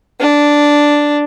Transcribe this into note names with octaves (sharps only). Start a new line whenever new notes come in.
D4